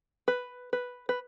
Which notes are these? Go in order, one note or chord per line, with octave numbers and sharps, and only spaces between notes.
B4
B4
B4